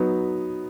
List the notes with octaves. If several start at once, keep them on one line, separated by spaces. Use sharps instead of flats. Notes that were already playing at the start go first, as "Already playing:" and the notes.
Already playing: F#3 B3 D#4